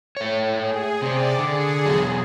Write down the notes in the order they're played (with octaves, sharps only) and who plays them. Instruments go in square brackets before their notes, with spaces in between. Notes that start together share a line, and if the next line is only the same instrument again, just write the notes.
[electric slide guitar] A3 C#5
[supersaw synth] G#4
[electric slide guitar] C3 C4 [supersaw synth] D5
[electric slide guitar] D3 [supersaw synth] G#4
[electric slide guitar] E2 B2 F#3